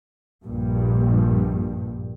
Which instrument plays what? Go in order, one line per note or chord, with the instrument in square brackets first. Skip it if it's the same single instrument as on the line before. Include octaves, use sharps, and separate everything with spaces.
[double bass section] A#1 G2